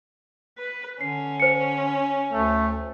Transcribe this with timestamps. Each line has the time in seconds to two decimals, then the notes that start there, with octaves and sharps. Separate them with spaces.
0.58 B4
1.01 D3 C#4 C7
1.40 C5 C#7
2.33 D2 A3